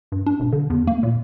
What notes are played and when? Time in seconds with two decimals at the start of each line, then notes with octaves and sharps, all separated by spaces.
0.12 G2
0.26 D4
0.40 E1
0.52 D3
0.70 E2
0.87 A#3
1.03 A#2